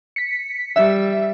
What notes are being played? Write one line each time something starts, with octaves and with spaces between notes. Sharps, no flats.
B6 C#7
G3 E5